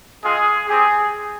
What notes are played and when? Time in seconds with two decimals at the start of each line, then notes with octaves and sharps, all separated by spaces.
0.22 G#3 C4 F4 G#4
0.68 C4 G4 G#4